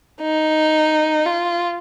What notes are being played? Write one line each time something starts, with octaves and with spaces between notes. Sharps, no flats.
D#4
F4